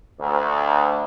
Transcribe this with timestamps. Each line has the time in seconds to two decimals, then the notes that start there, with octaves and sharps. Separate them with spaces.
0.20 D2